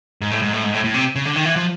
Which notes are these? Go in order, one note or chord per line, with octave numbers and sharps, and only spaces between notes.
G#2
A2
G#2
A2
G#2
A2
A2
C3
C#3
D3
D#3
E3
F3